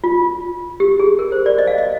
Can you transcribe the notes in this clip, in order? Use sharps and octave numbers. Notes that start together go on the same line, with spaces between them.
F4
G4
G#4
A#4
C5
D5
D#5
F5
D#5